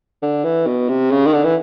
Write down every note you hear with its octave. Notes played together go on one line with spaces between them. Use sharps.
D3
E3
B2
C3
C#3
D#3
D3
E3